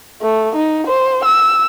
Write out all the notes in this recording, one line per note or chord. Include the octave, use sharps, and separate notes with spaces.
A3
D#4
C5
E6